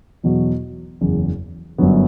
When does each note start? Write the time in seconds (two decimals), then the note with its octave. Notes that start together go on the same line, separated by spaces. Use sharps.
0.24 E2 B2 F#3
1.01 F#1 E2 C#3
1.78 G1 F#2 D3 F#3 B3